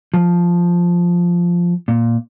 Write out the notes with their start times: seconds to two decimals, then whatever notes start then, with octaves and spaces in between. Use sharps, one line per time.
0.14 F3
1.88 A#2